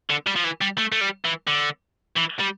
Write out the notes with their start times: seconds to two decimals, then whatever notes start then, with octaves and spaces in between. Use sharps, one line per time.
0.10 D3
0.27 G3
0.36 F3
0.44 E3
0.61 G3
0.78 A3
0.92 A3
1.01 G3
1.25 E3
1.47 D3
2.16 E3
2.39 G3